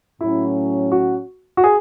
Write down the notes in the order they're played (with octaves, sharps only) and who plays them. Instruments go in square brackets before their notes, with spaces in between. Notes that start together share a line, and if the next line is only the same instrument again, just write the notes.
[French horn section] A2 F#3 C#4 [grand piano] E4
[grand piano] F#4
F#4
G#4